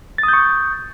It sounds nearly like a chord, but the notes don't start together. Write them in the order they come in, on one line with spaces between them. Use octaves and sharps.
A6 D#6 G6 C#6